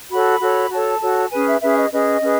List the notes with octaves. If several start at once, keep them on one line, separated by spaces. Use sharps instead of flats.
F#4 A4 C#5 B5
F#4 A4 C#5
F#4 A4 C#5 A5
F#4 A4 C#5
C#4 G#4 B4 G#5
E5
C#4 G#4 B4 E5
D#5
C#4 G#4 B4 D#5
C#4 G#4 B4